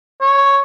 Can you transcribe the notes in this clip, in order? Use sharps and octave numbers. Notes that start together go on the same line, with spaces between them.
C#5